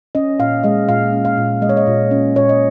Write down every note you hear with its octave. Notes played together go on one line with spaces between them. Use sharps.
C#4 D#5
A#2 F5
G#3 D#5
A#2 F5
C#4
F5
A#2
G#3 D#5
C#5
D#5
A#2
C#4
A#2 C#5
D#5